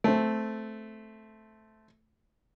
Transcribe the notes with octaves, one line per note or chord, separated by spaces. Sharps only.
A3 C4